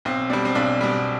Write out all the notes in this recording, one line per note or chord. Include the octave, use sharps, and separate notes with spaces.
B1 C4
B2 G3 D4
C4
B1 D4
B2 G3